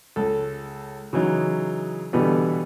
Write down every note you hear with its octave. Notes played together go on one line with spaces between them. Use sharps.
C#2 A4
C#3 E3 F#3 D#4
B2 D3 E3 G3 B3